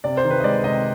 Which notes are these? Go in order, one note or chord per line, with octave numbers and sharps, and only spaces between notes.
C3 D5
C5
D#3
B4
D#5
G#3 D5
C3 D#5